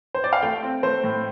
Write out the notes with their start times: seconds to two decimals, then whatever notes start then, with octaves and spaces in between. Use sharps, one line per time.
0.15 C5
0.24 D5
0.33 F5
0.42 A3 G5
0.63 C4
0.83 A3 C5
1.04 A2